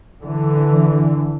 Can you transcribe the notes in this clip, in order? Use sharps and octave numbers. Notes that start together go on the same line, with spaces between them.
D3 E3